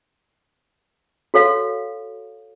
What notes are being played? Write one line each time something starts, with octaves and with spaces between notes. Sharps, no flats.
F#4 A4 C#5 F5